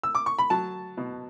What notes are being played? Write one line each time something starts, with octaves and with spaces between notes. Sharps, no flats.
E6
D6
C#6
B5
F#3 A5
B2